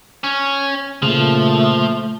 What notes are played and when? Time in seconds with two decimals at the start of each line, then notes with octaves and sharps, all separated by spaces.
0.24 C#4
1.03 A#2 C#3 F3 A3